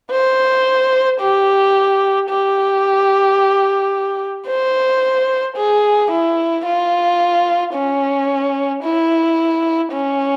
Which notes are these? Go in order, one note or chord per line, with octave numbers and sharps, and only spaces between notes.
C5
G4
G4
C5
G#4
E4
F4
C#4
E4
C#4